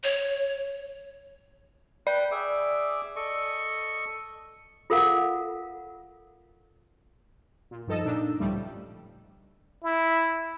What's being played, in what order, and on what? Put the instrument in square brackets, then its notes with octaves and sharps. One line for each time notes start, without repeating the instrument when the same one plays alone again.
[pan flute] C#5
[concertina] B4 G5 [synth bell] D5
[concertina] G#4 E5 D6
A4 D#5 C#6
[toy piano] F4 A4 A#4 F5 F#5
[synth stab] A#2
G2 F3 D#4 A4 D#5 E6
A#2 D4 D#4 E6
C#2 A2 F3 G3 A3
[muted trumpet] E4